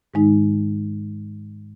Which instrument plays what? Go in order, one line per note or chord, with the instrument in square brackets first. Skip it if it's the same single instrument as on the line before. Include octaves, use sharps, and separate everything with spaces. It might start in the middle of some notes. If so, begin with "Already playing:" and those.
[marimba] G#2 D#3 G#3 D#4